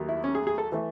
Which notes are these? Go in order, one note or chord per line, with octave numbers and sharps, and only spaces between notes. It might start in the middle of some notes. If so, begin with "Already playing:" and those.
Already playing: D#2 D#3 F#3 A3
E4
C#4
G#4
G#4
A4
E3 A3